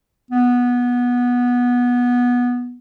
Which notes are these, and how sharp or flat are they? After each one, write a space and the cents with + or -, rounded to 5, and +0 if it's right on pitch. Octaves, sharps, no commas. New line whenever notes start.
B3 -15